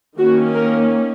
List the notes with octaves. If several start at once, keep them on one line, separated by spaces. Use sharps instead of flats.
D#3 A#3 C#4 F#4
A#4